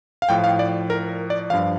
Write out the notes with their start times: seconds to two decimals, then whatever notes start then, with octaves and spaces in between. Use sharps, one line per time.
0.22 F5
0.29 A2 F3 G5
0.44 F5
0.59 D5
0.90 A#4
1.30 D5
1.50 G2 F3 F5